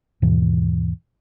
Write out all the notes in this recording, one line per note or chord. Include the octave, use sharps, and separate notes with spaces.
D#2 G#2 B2 E3